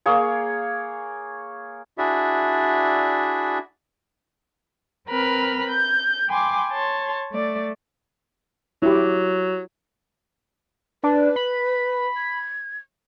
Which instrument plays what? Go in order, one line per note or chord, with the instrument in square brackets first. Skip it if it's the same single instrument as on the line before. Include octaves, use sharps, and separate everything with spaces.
[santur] A#3 G#4 C#5
[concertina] D4 E4 F#4 G#4 D5 E5
[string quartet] C4 A#4 B4 B5 F6
G6
G5 G#5 B5 C6 D6
C#5 A5 C6
A3 D5
[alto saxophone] F#3 [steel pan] E4 G4
[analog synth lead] D4 [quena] B4
[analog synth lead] B5
[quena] G#6